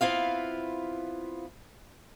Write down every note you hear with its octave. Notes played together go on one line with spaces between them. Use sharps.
B3 C4 E4 F4 F5